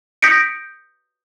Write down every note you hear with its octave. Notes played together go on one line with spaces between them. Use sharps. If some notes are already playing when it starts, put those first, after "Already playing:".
D#6 G6 A#6 B6 C#7 D7